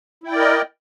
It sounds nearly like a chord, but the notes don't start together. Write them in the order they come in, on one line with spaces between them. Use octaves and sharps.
E4 G5 D5 A#4 D#5